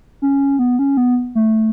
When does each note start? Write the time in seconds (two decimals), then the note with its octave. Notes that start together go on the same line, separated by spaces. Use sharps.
0.22 C#4
0.59 B3
0.79 C#4
0.97 B3
1.35 A3